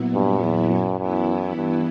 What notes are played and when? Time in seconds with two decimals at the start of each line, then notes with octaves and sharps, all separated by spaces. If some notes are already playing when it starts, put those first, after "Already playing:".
Already playing: A#2 F#3 B3 E4
0.14 G2
0.43 E2
0.71 F#2
0.99 F#2 E3 B3 E4
1.56 G2